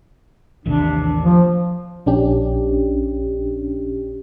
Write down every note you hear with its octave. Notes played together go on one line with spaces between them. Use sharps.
A1 D#2 C3 D4
F3
A#1 C#4 D4 G4